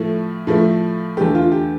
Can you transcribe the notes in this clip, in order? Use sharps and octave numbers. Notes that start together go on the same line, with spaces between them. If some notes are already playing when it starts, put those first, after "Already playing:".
Already playing: A2 F3 A3
A2 F3 A3
E2 D3 A3 G4
F4
G4